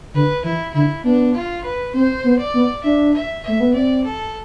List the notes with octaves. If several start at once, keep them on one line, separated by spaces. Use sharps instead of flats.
D3 B4
E3 E4
D3 E4
B3 D4
F4
B4
C4 C5
B3
D5
B3
D4 E5
E5
A3 E5
B3
C4 D5
A4